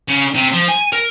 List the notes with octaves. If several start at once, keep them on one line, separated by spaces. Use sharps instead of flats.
C#3
C3
F3
G#5
A#4